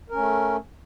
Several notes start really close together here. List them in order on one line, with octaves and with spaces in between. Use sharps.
A#4 C#4 A3